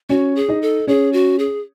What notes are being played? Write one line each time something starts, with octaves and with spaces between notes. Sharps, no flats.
C#4 F#4 C#5
G#4
D#4 D#5
A4
C#4 G#4 C#5
F#4
G#4